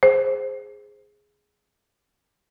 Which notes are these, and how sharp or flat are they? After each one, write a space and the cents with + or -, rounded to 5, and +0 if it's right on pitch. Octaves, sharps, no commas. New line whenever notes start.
G#4 +0 C5 +0